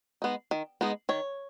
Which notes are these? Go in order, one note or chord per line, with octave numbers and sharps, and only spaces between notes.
G#3 B3 D#4
D#3
G#3 B3 D#4
D#3 C#5